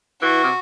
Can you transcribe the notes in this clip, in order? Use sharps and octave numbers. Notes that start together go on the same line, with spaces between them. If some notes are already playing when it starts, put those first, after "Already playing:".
E3 F#4
C3